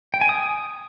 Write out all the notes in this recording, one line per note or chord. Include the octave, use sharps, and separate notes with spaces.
G5
G#5
D#6